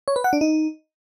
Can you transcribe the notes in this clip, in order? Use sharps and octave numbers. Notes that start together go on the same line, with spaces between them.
C#5
B4
F#5
D4
D#4